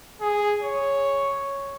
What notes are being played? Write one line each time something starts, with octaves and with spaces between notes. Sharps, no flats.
G#4
C#5